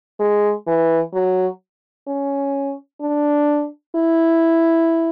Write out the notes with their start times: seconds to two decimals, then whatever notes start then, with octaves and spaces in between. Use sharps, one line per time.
0.19 G#3
0.67 E3
1.14 F#3
2.07 C#4
3.01 D4
3.95 E4